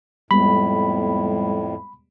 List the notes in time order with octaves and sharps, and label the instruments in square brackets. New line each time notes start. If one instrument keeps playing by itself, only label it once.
[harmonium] F2 A2 [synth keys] G3 G#3 B3 [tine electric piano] B5